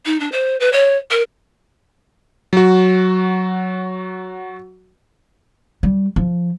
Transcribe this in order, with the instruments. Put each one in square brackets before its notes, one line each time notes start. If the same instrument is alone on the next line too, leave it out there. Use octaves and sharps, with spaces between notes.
[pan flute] D#4
D4
C5
B4
C#5
A#4
[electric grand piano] F#3 F#4
[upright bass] G3
F3